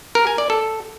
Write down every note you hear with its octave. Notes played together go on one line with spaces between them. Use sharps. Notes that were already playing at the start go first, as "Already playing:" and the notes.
A#4
G#5
D5
A4